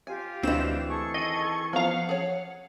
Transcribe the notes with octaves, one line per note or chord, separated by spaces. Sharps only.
F4 G4 F5 G#5
D2 E3 C4 F#4 D#5 E7
G#4 A4 C#6
D#3 D#5
F3 B3 F5 F#5 A#5
G#4 C#5